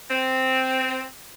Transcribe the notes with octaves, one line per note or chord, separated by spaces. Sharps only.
C4